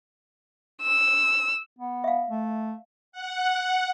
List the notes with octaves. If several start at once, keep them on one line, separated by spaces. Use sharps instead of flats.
E6
B3
E5 F5
A3
F#5